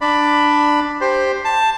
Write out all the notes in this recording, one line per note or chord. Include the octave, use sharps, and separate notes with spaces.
D4 D5 B5
G4 C5
A5